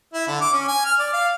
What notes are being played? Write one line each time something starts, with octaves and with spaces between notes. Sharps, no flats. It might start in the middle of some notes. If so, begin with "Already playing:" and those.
E4
D3
D6
C#4
G#5
F6
D5
F5